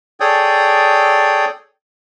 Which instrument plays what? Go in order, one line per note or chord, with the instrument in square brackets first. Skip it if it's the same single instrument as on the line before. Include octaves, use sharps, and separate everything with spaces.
[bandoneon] G#4 A4 C#5 D5 G5 D#6